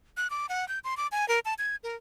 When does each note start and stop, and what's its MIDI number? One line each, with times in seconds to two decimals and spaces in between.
0.17 0.30 90
0.30 0.46 86
0.49 0.67 78
0.68 0.79 91
0.84 0.97 84
0.97 1.07 86
1.12 1.27 80
1.28 1.40 70
1.45 1.54 81
1.59 1.76 92
1.83 1.96 70